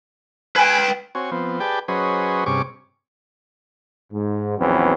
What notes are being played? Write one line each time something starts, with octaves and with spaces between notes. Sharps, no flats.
B4 G5 G#5
C4 F#4 C#5 G#5
F3 B3 C4
G4 G#4 B4 D5 G5 A5
F#3 C#4 G#4 B4 C5 D#5
G2 C3 C#4 G#4 C#6 D6
G#2
A#1 E2 F#3 C4 C#4 B4